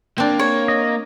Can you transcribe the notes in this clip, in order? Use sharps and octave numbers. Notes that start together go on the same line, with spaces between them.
A#3 C4 D4
C#5
D#5